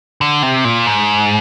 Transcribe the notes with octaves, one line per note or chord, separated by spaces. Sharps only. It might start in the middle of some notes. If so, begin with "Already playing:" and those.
D3
C3
A#2
G#2